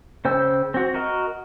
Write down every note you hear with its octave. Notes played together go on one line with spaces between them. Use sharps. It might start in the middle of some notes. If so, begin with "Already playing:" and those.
C#3 C5 G5 E6
C4 F#4
F#4 A#4 D#5